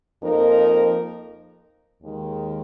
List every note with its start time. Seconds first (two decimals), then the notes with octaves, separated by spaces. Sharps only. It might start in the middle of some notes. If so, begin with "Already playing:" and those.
0.22 F2 F3 A#3 D#4 A#4
2.02 D#2 D#3 G#3